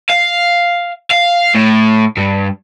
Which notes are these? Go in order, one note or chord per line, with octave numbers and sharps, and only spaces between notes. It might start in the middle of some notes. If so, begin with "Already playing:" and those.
F5
F5
A2
G2